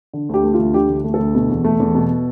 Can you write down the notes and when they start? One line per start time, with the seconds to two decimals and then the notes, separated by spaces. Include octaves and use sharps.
0.13 D3
0.29 D2 G4
0.44 A3
0.54 F4
0.59 D2
0.74 D3 G4
0.89 D2
1.04 A3
1.14 A4
1.19 D2
1.35 B2
1.49 E2
1.64 A3
1.80 E2
1.95 B2